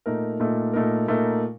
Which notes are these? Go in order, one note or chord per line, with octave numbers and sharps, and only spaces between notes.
A#2 A3 D#4 A#4
A#2 A3 D#4 A#4
A#2 A3 D#4 A#4
A#2 A3 D#4 A#4